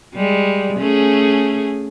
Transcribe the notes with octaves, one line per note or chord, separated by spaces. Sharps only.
G3 G#3
A3 C#4 G#4